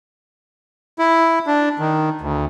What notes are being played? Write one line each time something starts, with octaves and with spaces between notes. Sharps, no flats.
E4
D4
D#3
D2